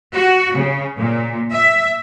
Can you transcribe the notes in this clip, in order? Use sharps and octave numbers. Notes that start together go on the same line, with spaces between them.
F#4
C#3
A#2
E5